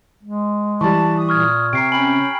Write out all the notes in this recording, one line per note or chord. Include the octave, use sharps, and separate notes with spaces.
G#3
E3 G3 A5 C#6
D#6
A#2 C#6 F6 G#6
C3 G5 A#5 C#6 C7 D7
C#4 G5 G#5 B5 F#7